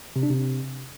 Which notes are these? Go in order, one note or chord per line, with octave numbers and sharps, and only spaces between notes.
C3
D4
C3